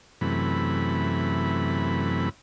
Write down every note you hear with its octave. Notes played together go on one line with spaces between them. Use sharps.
F#2 C3 E3 A3 B5